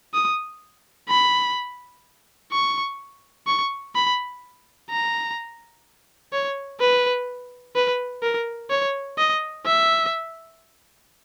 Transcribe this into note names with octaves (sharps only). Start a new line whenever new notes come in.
D#6
B5
C#6
C#6
B5
A#5
C#5
B4
B4
A#4
C#5
D#5
E5